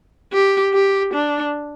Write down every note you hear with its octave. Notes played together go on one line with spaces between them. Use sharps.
G4
G4
D4